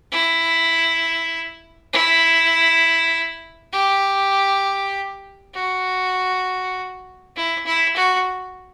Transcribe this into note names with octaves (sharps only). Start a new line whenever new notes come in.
E4
E4
G4
F#4
E4
E4
F#4